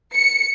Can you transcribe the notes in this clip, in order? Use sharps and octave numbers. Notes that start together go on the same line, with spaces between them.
C#7